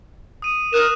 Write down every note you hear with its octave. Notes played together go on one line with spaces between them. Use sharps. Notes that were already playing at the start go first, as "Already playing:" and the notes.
D#6 D#7
A#4 D#6 F#6 E7